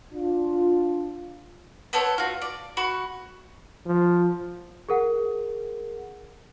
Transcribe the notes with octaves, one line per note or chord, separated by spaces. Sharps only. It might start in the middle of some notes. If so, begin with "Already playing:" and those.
D4 F4
B3 C4 A4 C#5
F4 F#4
D5
F#4 B5 C#6
F3
G#4 A#4 F#5